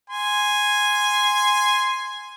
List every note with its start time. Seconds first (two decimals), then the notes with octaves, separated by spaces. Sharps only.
0.10 G#5 C6